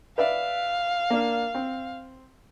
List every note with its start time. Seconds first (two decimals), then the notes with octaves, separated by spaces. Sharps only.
0.18 B4 D5 E5 F5
1.10 A#3 D4
1.55 C4